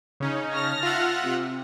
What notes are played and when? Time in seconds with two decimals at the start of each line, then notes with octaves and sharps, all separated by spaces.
0.20 C#3 C#4 D#4
0.52 A5 F6 A#6
0.83 F4 E5 F#5
1.23 C3